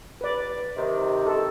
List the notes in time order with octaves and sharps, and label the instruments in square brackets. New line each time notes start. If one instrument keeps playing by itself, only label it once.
[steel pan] B4 D5
[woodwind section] C3 D#3
[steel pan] A4